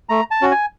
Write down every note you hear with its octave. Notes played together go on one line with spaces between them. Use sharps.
A3 A#5
A5
C#4 F#4
G#5